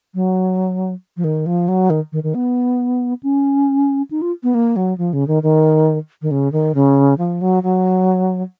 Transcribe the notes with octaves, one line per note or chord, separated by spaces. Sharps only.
F#3
F3
D#3
F3
F#3
D#3
D#3
D#3
B3
C#4
D#4
F4
B3
A#3
F#3
F3
C#3
D#3
D#3
D#3
C#3
D#3
C#3
F3
F#3
F#3